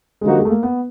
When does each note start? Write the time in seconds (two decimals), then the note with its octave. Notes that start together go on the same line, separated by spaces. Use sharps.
0.21 G#3
0.26 D3 F3 G3 A#3 D#4 F#4
0.39 G#3
0.45 A3
0.50 A#3
0.63 B3